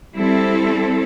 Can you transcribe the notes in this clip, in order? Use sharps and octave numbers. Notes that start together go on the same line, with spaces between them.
G3 C4 E4 A4